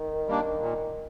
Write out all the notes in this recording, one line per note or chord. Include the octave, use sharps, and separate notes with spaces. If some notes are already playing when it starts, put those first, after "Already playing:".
Already playing: D#3
G3 A#3 D4
A#2